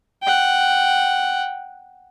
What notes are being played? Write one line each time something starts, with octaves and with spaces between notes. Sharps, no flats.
F#5 G5